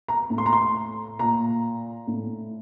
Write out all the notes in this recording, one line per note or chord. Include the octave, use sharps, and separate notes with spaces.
A#5
A2
C6
A#5
C6
A#2 A#5
A2